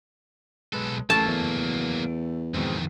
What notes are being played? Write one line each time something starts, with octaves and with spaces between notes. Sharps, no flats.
B1 G#3 A4 B4
A1 F#3 A3 A#3 A4 A5 C#6
E2
F2 B2 D#3 G#3 C4